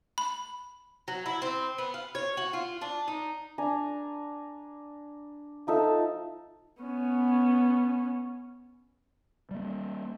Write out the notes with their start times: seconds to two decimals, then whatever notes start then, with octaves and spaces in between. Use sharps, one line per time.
0.18 B5
1.08 F#3
1.26 E4
1.42 C4
1.78 B3
1.94 F5
2.15 C#5
2.37 F#4
2.53 F4
2.81 D4
3.08 D#4
3.58 D4 G#5 A#5
5.67 F3 D#4 A4 E5
6.82 B3 C#4
9.51 G3 A#3